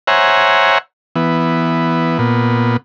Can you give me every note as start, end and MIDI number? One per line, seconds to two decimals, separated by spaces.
0.07 0.78 72
0.07 0.78 73
0.07 0.78 76
0.07 0.78 78
0.07 0.78 80
0.07 0.78 82
1.16 2.18 52
1.16 2.18 59
2.19 2.77 46
2.19 2.77 59